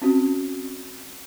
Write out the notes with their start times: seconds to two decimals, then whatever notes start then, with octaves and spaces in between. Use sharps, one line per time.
0.02 C4 C#4 F#4